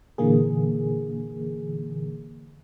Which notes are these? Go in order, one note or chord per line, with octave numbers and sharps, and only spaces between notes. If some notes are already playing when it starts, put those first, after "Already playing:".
A#2 D3 E3 A#3 G#4